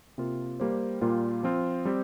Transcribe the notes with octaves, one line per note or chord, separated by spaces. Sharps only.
C3 A#3 F4 A#4
G3 A#3 G4 C5
A#2 G3 A#3 F4
F3 C4 F4
G3 C4 G4